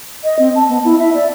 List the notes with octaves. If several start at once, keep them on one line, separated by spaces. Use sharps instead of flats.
D#5
C4
A5
B3
E4
E5
D5